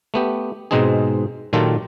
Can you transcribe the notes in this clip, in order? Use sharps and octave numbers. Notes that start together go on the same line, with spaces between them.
A3 B3 G4
G#2 B2 G#3 C4 D#4 G#4
A#2 D#3 F#3 F4 G4 A4